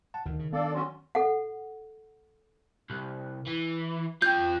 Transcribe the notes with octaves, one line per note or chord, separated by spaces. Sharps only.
F#5 A5
D2 D#3
C#3
B3 D4 A4 D5 F5
F#3 C#4 F#4 C6
A4 F#5
C2
E3
F4 G5 G6